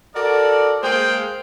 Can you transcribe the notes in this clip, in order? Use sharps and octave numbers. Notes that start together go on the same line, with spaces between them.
F#4 A4 A#4 D5
G#3 A#3 G#4 C5 F5 G5